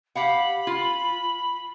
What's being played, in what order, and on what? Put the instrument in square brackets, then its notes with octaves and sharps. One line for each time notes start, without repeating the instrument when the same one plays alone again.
[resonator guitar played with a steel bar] G4 F5 F#5 [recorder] B5
[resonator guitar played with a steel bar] F4